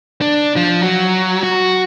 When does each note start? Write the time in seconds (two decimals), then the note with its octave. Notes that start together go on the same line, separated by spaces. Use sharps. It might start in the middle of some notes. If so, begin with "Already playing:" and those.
0.21 D4
0.56 F3
0.83 F#3
1.43 F#4